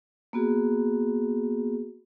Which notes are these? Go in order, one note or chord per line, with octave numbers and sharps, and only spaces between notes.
A#3 B3 F#4 G#4